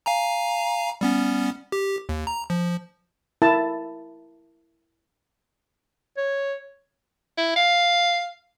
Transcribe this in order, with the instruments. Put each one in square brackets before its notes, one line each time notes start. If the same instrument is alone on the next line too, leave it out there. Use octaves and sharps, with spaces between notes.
[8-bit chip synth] F5 G#5 A#5
G3 B3 C#4
G4
D#2
A#5
F3
[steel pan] E4 A#4 A5
[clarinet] C#5
[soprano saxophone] E4
F5